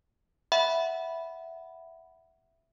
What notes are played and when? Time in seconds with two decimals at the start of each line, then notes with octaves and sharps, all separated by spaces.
0.52 E5 F#5 B5